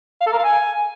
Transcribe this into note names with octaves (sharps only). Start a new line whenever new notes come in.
F5
A4
A#4
F5
G#5